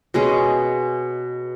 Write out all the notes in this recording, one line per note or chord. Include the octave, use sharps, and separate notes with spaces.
B2 G#3 C#4 G#4